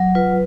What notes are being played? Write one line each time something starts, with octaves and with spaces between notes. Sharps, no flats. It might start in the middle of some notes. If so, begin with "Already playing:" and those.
Already playing: F#3
F4 B4